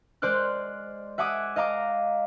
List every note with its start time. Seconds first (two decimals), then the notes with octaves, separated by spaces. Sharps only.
0.22 G#3 C5 D5 F6 F#6
1.18 E5 F#5 G#5 D6 D#6
1.56 D#5 F5 A#5 D6